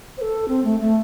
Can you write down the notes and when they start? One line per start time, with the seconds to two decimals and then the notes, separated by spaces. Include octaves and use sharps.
0.17 C5
0.21 A4
0.49 C4
0.65 A3
0.80 A3